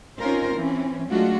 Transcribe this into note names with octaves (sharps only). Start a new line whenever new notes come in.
C4 C#4 D#4 F4 A#4 C5
E3 C4 C#4
F#3 G#3 A3 D4 F4 F#4